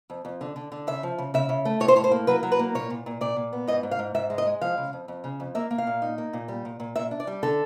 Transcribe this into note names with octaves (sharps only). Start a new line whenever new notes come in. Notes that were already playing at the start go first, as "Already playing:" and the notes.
F2
F2
D3
D3
D3
C#3 E5
F3
C#3
C#3 E5
C#3
A3
A2 C#5
C5
A2 C#5
C5
A#3
F#3 B4
F#3
B4
A#3
A#2 C#5
A#2
A#2
A#2 D5
A#2
B3
G#2 D#5
G#2
F5
G#2
G#2 E5
G#3
D#5
G#3
F3 F5
C#3
F2
F2
C#3
F2
A#3 E5
A#3
F5
A#2
D#4
A#3
A#2
G3
A#2
A#2
A#2 E5
D4
D5
G3
D3 A4